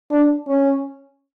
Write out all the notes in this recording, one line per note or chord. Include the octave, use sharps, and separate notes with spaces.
D4
C#4